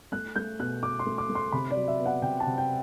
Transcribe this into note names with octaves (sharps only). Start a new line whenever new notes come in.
A3 F#6
A3 G6
B2 F#6
B2 D6
C6
A3
D6
A3
C6
C3 B5
D5
F#3
E5
B3
F#5
C3 G5
A5
C3
G5